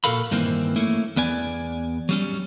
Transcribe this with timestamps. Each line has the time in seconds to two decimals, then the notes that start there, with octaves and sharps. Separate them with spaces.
0.04 A#2 F#4 A4 A#4 F5 B5
0.31 G2 D#3 E3 A#3 C4
0.76 A3 A#3 C#4 E4
1.16 E2 B3 D5 G#5
2.09 F#3 G3 C#4